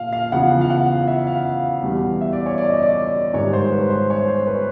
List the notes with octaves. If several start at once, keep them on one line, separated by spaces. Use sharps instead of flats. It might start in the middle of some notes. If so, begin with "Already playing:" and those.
Already playing: A#2 F5
F5
E2 C#3 F3 F#5
F5
F#5
E5
F5
E2 B2 G3
E5
D5
C#5
D5
D#5
D5
G#2 D#3 G3 C#5
C5
B4
C5
C#5
C5
B4